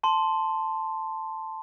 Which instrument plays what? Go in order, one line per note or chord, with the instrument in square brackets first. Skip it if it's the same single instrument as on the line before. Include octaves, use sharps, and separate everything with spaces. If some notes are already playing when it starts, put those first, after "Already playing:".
[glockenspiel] A5 C6